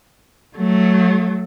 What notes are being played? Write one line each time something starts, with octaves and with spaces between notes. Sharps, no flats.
F#3 A3